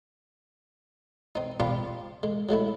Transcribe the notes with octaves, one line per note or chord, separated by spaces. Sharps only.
C4 D#4
C4 D4 F4 G4 A#5 B5
G#3
F#3 G#3 A3 E4